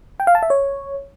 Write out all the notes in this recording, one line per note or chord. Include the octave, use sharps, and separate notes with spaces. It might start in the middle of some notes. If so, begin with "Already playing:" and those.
G5
F5
A5
E5
C#5